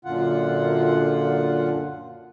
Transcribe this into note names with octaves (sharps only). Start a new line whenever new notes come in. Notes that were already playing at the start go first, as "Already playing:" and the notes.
F#2 A#2 D3 F4 F#5